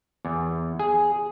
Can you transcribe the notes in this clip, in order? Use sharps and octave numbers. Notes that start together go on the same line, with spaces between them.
E2
G#4